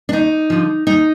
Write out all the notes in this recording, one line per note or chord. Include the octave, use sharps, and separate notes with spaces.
D4
D#2 D#4
D3 F3
D#2 D#4